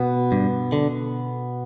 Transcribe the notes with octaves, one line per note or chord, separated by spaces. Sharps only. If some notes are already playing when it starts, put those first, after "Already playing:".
Already playing: B2 B3
G2
D3